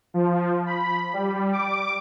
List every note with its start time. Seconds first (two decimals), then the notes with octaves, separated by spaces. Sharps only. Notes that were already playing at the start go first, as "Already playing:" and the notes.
0.14 F3
0.66 B5
1.13 G3
1.52 D6